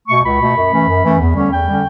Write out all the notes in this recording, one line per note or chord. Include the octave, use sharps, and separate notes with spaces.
B2 A3 C#6
C#2 B5
B2 A3
F#2
E3 A3 C#4
F#2
E3 A3 C#4
E2
D3 G3 C#4
E2 G5
D3 G3 C#4